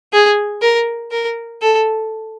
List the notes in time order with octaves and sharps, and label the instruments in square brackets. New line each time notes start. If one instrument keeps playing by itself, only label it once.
[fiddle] G#4
A#4
A#4
A4